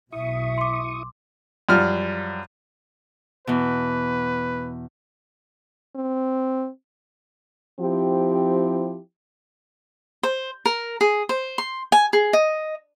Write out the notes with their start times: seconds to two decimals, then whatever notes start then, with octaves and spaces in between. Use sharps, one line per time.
0.12 B1 B2 E4 E5 C#6 D#6
0.58 C6 D6
1.69 F#2 F3 G3 F6
3.47 E2 B2 B4
5.96 C4
7.80 F3 C4 E4 G4
10.23 C5
10.65 A#4
11.01 G#4
11.29 C5
11.58 C6
11.92 G#5
12.13 G#4
12.33 D#5